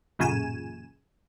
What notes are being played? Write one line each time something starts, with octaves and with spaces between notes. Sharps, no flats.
A1 F#2 A#2 C#3 G#5 E7